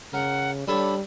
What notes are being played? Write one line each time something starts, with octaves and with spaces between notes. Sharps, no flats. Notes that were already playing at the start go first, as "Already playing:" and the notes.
C#3 A#4 F#5
G3 D4 A4 C#5 B5